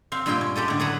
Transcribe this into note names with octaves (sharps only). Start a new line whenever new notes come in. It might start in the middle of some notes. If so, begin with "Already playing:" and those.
C4 F5
G2 A#2 G#3 F4 A#4 G5
C#4
G#3 G4 A4 D#5
A2 D3
F#3 A3 G#4 B4 F#5 A#5